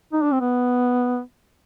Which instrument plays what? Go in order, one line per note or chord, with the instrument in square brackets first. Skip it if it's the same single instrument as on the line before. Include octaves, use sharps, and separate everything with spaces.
[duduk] D#4
D4
C4
B3